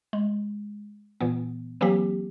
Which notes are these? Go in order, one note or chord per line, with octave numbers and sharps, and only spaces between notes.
G#3
A#2 E3 B3
E3 F#3 A#3 C4 G4